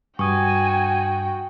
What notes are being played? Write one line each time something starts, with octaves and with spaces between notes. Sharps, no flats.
G2 F#4 G5 G#5 C#6 D#6